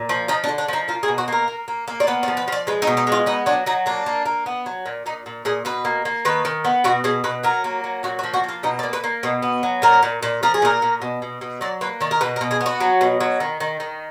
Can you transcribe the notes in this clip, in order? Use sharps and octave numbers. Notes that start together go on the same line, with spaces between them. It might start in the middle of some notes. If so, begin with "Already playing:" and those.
Already playing: A#2
F3
F3 D#4
D4
D3
D4
F3 D#4
A#3 F4
G#4
B2
F#4
A#3 A#4
A#3
A#3
A#3
D5
B3 B4
D5
F3
B4
F3 D5
G#3 B4
D#4
B2
D#4
G#3 F4
B3 D#4
F#3 D4
F#3 D#4
A#3 D4
A#3
A#3
B3
F#3
A#2
A#2 D#4
A#2
A#2 G#4
B2 B4
A#3
A#3
D#3 B4
D#3
B3
B2 F#4
B2 G#4
B2 B4
F#3 A#4
A#3
F#3
A#2 F#4
F#4
F3
F#4
A#3 F4
B2 D#4
D5
A#3
B4
A#3
B2
B3
F#3
A#2 A#4
A#2
A#2
F3 A#4
G#4
A#2 A#4
A#2
B2
B2
B2
F#3 D5
A#3 B4
D#3 D5
A#4
B2 B4
A#4
B2
G#4
B3
F#4
F#3
B2
F#3
D#3
D#3
D#3